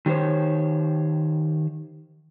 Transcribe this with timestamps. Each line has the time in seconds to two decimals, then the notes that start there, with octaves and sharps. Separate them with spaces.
0.06 D#3 F#3 G4 C5 C#5